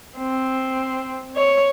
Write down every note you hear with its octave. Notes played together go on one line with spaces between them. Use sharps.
C4
C#5